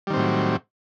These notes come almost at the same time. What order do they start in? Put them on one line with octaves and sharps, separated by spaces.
G3 D#3 C4 A2 F#3